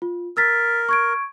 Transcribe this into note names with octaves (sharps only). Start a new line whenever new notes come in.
F4
A#4 E6 A6 B6
C#6 G#6 D7